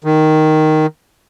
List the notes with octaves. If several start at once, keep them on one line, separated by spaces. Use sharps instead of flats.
D#3